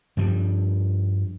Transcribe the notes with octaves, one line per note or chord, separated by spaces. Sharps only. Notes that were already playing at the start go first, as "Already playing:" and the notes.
G2 F3 G3